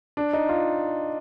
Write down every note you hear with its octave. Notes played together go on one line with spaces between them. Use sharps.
D4
D#4
F4